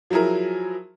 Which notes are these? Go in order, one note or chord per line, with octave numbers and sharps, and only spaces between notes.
F3 F#3 E4 G#4 A#4